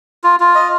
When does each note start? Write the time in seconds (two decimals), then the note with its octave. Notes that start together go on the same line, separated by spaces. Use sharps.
0.24 F4
0.40 F4
0.55 D#5